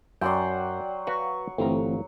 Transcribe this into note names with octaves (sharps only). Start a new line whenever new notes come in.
F#2 F#3 D5 F#5 G5 C6
F#4 B4 F5 C#6
G1 E3 A3 C4 F5 A#5